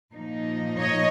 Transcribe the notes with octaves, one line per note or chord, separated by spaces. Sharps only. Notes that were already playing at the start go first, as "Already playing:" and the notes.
A#2 F3 A#3 D#4
C#5 D#5